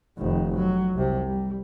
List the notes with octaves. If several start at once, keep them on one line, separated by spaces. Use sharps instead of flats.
F1 D#3
F#3
C2 C3
G3